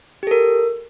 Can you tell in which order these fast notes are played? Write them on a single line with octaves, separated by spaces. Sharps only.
G4 A4 A#4